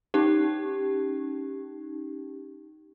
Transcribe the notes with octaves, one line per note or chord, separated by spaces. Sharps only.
C#4 D#4 G4